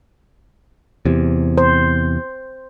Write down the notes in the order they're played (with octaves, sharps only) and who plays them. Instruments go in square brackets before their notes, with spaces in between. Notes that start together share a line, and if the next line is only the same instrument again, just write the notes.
[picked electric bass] E2 C3
[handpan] C5